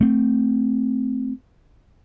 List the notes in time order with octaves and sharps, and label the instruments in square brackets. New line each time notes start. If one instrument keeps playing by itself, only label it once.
[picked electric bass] A3 C4